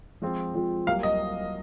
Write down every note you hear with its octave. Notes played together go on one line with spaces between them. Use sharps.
F3 G#3 C4 F4
F3 G#3 C4 F4
C2 C3 F#3 A#3 F5
D#5